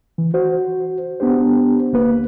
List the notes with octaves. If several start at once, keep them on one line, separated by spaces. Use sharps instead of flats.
E3
F#4 C5
B3 D4 G4 C5
D2 A#3 B4